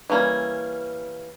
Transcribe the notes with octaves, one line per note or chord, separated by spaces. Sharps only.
E3 G3 A#3 C#4